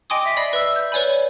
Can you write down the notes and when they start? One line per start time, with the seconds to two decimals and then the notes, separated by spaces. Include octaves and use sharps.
0.10 D#5 G5 G#5 C6 D6 D#6
0.26 E5 B6
0.37 D5 D#5 B5 A#6 C7
0.53 B4 E5 E6
0.76 G6
0.92 B4 C#5 D5 G#5 B5